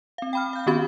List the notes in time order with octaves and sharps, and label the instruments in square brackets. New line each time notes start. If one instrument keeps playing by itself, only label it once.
[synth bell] C4 F5
G5 B5 F6
F5 G6
D#3 B3 C#4 F#4 G4 B5